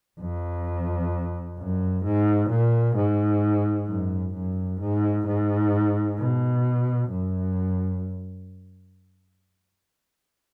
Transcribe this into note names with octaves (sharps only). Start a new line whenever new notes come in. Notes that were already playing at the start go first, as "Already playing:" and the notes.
F2
F#2
G#2
A#2
G#2
F#2
F#2
G#2
G#2
B2
F#2